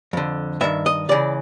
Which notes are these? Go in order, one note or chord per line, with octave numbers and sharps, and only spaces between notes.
F2 D3
G2 D#3 E5
D#5
C#2 C#3 E3 D5